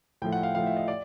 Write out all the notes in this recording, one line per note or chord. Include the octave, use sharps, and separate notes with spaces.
A2 F3 A3 G5
F#5
F5
A2 F3 A3 F5
E5
D#5
D5